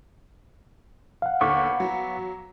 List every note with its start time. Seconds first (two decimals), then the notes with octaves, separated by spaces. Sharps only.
1.22 F5 F#5
1.41 D#2 D3 B3 C#6 D6
1.80 F#3